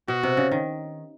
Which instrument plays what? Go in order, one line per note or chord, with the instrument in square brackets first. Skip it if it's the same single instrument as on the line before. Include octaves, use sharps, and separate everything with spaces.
[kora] B2 [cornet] F#4
[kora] C3
C#3
D#3